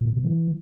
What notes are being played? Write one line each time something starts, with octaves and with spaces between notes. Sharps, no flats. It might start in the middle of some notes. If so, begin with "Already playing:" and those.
A#2
B2
E3